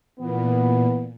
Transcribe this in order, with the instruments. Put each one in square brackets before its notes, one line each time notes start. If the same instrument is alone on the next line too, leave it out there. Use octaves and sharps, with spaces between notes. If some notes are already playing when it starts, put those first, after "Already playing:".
[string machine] A#2 [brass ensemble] E3 B3